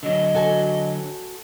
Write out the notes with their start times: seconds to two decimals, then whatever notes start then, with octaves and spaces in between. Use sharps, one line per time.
0.03 D3 F#3 D#5
0.35 F#4 A4 G#5